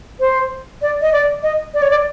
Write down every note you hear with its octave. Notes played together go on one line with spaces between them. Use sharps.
C5
D5
D#5
D5
D#5
D5
C#5
D5